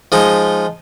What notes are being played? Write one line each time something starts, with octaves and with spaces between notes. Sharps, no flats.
F3 G#3 D#4